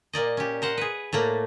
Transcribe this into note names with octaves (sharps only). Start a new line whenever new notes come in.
A#2 A#3 D5 D#5
C#4 G4
A#4 C5 F#5
G#4 B4
A2 A3 A#3 D5